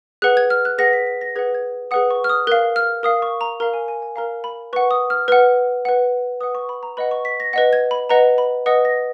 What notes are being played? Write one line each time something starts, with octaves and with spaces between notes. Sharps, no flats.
G#4 B4 F#5 F#6
G#6
F6
F#6
G#4 B4 F#5 A#6
B6
B6
A#6
G#4 B4 F#5 G#6
G#6
G#4 B4 F#5 D#6
C#6
F6
D#6
A#4 F5 F#6
F6
A#4 F5 D#6
C#6
A#5
A#4 F5 A#5
G#5
G#5
G#5
A#4 F5 A#5
B5
B4 F#5 C#6
D#6
F6
B4 F#5 F6
B4 F#5
B4 F#5 D#6
C#6
B5
A#5
B4 D#5 F#5 B5
C#6
B6
A#6
B4 D#5 F#5 A#6
G#6
B5
B4 D#5 F#5 A#5
B5
B4 D#5 F#5 D#6
A#6